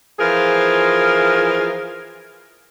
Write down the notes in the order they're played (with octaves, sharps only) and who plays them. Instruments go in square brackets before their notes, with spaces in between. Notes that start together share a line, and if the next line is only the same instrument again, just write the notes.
[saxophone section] E3 F3 F4 G#4 A#4